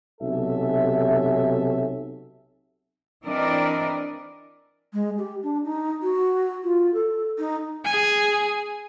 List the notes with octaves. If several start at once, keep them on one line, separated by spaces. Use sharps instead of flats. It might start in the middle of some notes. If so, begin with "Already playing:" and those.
B1 C3 C#4 A4 E5
E3 C4 D4 A#4 D5 D#5
G#3
G4
D4
D#4
F#4
F4
A4
D#4
G#4 G#5